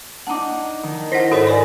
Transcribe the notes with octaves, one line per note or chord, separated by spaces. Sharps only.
D4 D#4 F#5 D6
D#3
E4 C5 F#5 A#6 B6
G#2 F#4 A4 A#4 C5 C#5
B4 C#5 D5 G#5 B5